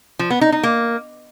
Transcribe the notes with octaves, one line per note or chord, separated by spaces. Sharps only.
F3
B3
D#4
D#4
A#3